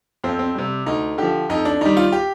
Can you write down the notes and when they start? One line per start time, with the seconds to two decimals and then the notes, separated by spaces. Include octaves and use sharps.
0.24 F2 C4
0.39 C4
0.55 C3 G3
0.86 D2 D#4
1.18 D3 F3 G4
1.49 F2 D#4
1.65 D4
1.81 D#3 G3 D#4
1.97 F4
2.12 G4